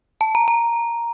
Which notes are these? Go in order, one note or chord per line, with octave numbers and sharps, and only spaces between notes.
A5
A#5
A#5